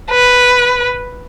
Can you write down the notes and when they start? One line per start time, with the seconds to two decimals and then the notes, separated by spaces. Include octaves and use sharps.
0.11 B4